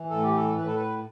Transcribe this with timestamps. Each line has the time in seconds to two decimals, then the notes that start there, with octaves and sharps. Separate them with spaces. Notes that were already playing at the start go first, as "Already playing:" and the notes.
Already playing: E3
0.10 A2 A4
0.23 G4
0.36 A4
0.57 A2 B4
0.66 A4
0.74 B4